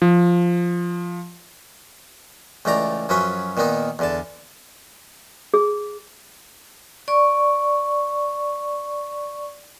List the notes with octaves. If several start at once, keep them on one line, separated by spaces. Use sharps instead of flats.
F3
C#2 E3 A3 D5 A#5
F#2 F3 F#3 C#4 B4
A#2 D#3 A#3 B3 D#4
E2 D3 A5
G#4
D5 C#6